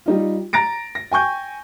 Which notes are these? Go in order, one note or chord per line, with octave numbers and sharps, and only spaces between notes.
G3 D#4 F4
A#5 A6 A#6 D7
A#6
G5 G#5 C#6 G6